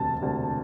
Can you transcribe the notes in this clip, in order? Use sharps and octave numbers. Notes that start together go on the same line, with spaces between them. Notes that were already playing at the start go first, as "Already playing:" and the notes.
Already playing: E1 D2 C3 A5
E1 D2 C3